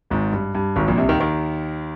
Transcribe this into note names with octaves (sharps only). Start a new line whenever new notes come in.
G#1 G#2
G2
G2
G#1 G#2
A#1 A#2
C2 C3
D#2 D#3
D#2 D#3